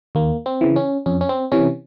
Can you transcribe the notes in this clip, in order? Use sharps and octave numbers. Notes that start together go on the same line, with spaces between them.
D#2 A#3
C4
C#3 E3
C#4
F2 C#4
C#4
C4
C3 E3 C#4